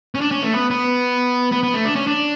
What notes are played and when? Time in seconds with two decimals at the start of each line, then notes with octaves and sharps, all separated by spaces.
0.15 C#4
0.21 D4
0.31 C#4
0.42 A3
0.53 B3
0.70 B3
1.52 B3
1.63 B3
1.74 A3
1.85 D4
1.96 C#4
2.07 D4